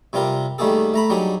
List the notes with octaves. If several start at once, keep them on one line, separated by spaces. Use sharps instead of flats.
C3 G3 F4 G4 A#4
D#3 G3 A3 A#3 G#4 A4
A3 A#5 B5
F#3 G3 D4 D#4 G#4